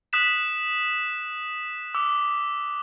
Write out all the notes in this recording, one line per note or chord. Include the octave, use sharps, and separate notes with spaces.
D#6 F#6 B6 E7
D6 E6